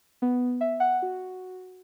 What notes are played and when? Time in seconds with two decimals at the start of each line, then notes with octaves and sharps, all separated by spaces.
0.22 B3
0.61 E5
0.80 F#5
1.02 F#4